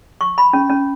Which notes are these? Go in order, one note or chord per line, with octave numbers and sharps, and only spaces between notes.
C#6
B5
C#4
C#4